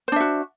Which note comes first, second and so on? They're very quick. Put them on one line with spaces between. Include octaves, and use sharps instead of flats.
C5 D4 E5 F#4